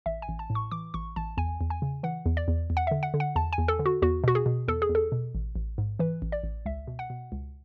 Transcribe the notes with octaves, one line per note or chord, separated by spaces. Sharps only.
A1 E5
G#5
A1
A5
A2
C#6
E3 D6
A1 C#6
A1 A5
E2 G#5
E2
G#5
C#3
E3 F#5
E2
D5
E2
E2
F#5
D3 E5
F#5
D3
F#5
E2 A5
G#5
E2
A4
D3
F#4
E2 F#4
B2 F#4
G#4
B2
E2 A4
G#4
E2
A4
B2
A1
A1
G#2
E3 B4
A1
D5
A1
C#2 E5
B2
F#5
B2
C#2